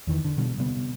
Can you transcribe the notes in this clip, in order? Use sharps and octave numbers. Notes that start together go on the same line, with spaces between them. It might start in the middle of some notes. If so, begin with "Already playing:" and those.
E2 D#3 E3
D3
B2 D3 G3
C3 G3 B3